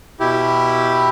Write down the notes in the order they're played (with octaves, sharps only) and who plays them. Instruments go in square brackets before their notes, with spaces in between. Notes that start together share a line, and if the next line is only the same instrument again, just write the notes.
[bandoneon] B2 E4 G4